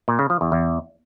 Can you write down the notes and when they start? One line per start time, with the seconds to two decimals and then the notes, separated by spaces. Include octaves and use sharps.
0.08 A#2
0.19 C#3
0.30 F3
0.41 E2
0.52 E2